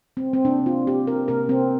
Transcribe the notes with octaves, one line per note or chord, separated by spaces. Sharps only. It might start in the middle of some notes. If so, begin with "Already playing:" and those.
C4
C4
C3 A#3 D4
F4
G4
A#4
C3 A#3 A#4
C4